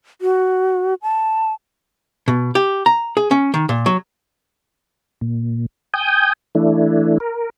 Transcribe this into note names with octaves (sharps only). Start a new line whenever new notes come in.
F#4
A5
B2
G4
A#5
G#4
C#4
D#3
A#2
F#3
A#2
G5 G#5 D#6 G6
E3 A3 D4 E4
A#4